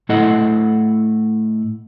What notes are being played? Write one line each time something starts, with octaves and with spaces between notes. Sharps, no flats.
A2 E4 A4 D#5 F#5